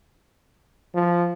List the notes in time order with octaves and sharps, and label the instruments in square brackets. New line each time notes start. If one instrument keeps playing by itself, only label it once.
[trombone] F3